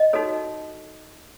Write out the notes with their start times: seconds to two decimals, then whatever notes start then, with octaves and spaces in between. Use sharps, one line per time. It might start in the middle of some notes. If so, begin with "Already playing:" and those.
Already playing: D#5
0.13 D#4 F#4 A4 C#5